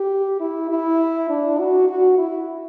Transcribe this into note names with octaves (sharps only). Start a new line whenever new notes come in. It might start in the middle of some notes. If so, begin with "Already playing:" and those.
Already playing: G4
E4
E4
D4
F#4
F#4
E4